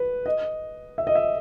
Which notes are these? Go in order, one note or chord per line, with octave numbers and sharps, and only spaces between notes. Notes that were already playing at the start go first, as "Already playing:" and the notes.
Already playing: B4
D#5
E5
D#5
E5